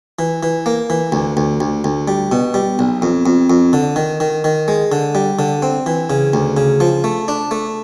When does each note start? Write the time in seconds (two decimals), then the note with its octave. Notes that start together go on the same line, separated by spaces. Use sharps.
0.19 E3
0.43 E3
0.66 A#3
0.90 E3
1.12 D2
1.37 D2
1.60 D2
1.84 D2
2.08 G3
2.32 B2
2.54 G3
2.79 B1
3.02 F2
3.26 F2
3.50 F2
3.73 D3
3.96 D#3
4.20 D#3
4.44 D#3
4.68 G#3
4.92 D3
5.15 G3
5.39 D3
5.62 C4
5.86 E3
6.10 C#3
6.34 D2
6.57 C#3
6.80 F3
7.04 A3
7.28 D4
7.51 A3